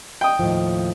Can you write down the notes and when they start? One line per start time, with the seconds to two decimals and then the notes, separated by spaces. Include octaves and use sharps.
0.21 G5 D#6
0.39 D#2 A2 F3